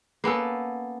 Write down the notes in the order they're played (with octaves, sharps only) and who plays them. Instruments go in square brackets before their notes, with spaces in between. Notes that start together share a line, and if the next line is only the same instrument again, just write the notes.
[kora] A#3 B3 C#4 A4